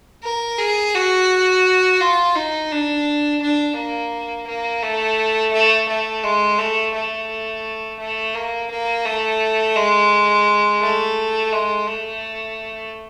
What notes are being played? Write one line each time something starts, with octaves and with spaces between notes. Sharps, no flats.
A#4
G#4
F#4
F4
D#4
D4
D4
A#3
A#3
A3
A3
A3
G#3
A3
A3
A3
A#3
A#3
A3
G#3
A3
G#3
A3